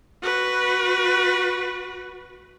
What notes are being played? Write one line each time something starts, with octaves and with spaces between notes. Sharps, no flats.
F#4 B4